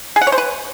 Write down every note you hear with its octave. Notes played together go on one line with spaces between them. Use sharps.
G#4
F#5
C#5
C5
B4